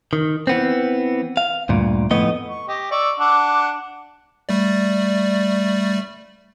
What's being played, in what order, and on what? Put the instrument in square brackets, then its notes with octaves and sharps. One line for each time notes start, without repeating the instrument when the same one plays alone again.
[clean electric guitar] D#3
E3 B3 C4
F5
D2 G2 A#2
F2 A2 A3 B3 D#5
[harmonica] C#6
G4 D#5
D5 C#6 E6
[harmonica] D4 F#5 [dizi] D6
[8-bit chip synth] G3 A3 D5